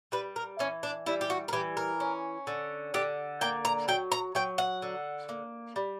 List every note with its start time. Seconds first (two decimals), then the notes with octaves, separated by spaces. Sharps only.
0.12 G3 B4
0.36 A#4
0.59 E3 C#4
0.83 D4
1.06 G3 E4
1.21 G4
1.30 F#4
1.48 A#4
1.53 E3 G4
1.77 A#4
2.00 C#4
2.47 D3
2.94 D3 G4
3.41 A#3 G5
3.65 A#5
3.88 F#3 G5
4.12 A#5
4.35 F#3 G5
4.58 F#5
4.82 D3
5.29 A#3
5.76 G3